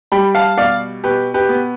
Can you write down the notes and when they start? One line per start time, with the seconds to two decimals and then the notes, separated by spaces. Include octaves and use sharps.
0.12 G3 G5 B5
0.35 F5 A5
0.58 B2 D5 F5
1.04 B2 G4 B4
1.34 G4 B4
1.49 B3